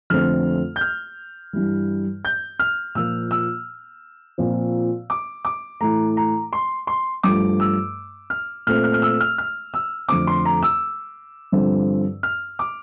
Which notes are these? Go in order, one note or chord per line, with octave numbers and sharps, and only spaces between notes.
F2 D3 A3 C4 F6
G6
F6
G2 E3 G3
G6
F6
A#2 F3 A#3 E6
E6
A#2 F3 C4
D6
D6
A2 E3 A3 A#5
A#5
C6
C6
G2 F3 A3 D6
E6
F6
A#2 A3 C4 F6
F6
F6
E6
F6
F6
E6
F2 D3 A3 C4 D6
C6
A#5
E6
G2 D3 F3 C4
F6
D6